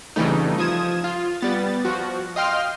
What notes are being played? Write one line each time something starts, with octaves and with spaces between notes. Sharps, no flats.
F2 C#3 E3 G3 A3 D#4
F3 D#6 G#6 E7
F4
G3 B3 A6
F3 F#4
D#5 F5 G5 C6 F6